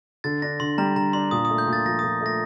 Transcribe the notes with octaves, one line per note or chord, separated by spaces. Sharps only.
D3 A6
D4 A#6
D3 C6
G3 A#5
D3 A#5
D4 C6
A#2 D#6
D#6
A3
G6
A#2
A6
F3 A#6
A#2 D#6
A3 A#6